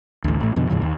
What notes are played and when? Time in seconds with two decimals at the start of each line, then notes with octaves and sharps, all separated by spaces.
0.24 A1 D2
0.40 A1 A2
0.56 F2 B2 D3
0.70 D#2 G#2 C#3 F3
0.82 D#2